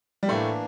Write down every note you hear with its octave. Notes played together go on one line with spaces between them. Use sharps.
G3
A2 E3 A3 A#3 D4